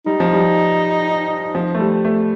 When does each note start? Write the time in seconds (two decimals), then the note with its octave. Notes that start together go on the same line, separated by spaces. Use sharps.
0.06 G3 D#4
0.20 F3
0.33 G3
1.55 F3
1.75 A3
1.80 G3
2.05 A3